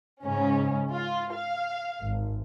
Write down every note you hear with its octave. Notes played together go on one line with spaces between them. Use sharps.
G#2 C#3 C#4
F4
F5
G#1